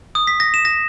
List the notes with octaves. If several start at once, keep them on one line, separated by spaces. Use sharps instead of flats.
D#6
B6
A#6
E7
A#6